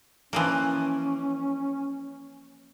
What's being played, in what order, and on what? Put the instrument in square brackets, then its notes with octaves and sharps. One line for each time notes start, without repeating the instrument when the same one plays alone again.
[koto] E3 F3 A#3 [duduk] C#4